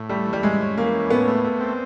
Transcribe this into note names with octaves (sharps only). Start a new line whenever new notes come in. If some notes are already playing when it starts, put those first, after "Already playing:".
Already playing: A2
G3 A3
E3
G3
A2 G#3
C#4
E3 A#3
C#4
A2 B3
A3
A3
C4